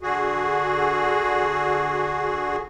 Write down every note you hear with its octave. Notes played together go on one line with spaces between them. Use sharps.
D3 F#4 G#4